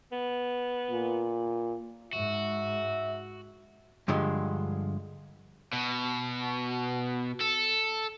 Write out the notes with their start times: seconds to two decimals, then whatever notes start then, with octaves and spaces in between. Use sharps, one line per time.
0.12 B3
0.91 A#2
2.13 G#2 F#4 E5
4.08 G2 D3 F3 G#3
5.73 B2
7.40 A4